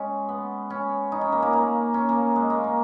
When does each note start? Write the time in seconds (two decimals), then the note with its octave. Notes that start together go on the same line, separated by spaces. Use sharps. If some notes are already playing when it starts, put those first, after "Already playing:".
Already playing: G#3 C#4
0.29 B3
0.70 C#4
1.12 D#4
1.21 C#4
1.32 A#3
1.42 A#3
1.53 A#3
1.94 C#4
2.09 A#3
2.36 G#3
2.50 A#3
2.64 A#3